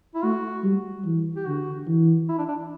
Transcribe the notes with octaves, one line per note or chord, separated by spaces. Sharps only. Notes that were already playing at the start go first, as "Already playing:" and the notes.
E4
A3 F#4
G3
E3
G4
D3 F#4
E3
E4
D4
D4